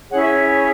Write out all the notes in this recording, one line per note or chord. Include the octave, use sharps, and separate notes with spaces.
C#4 E4 G#4 C#5 F#5
E5